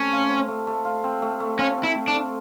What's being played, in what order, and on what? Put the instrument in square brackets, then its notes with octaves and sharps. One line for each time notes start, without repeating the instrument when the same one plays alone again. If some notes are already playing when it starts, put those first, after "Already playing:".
Already playing: [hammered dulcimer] A3 C4 [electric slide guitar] C#4
[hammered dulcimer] F4
C4
A3
A3
F4
C4
A3
A3
[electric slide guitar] C#4 [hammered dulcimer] F4
[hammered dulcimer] C4
[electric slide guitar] E4
[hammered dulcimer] A3
[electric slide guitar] D4
[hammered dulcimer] A3